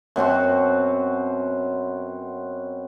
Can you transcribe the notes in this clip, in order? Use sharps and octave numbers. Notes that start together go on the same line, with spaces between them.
F#2 B2 C4 F#4